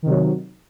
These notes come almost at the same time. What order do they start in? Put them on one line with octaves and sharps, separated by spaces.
D#3 C3 F#3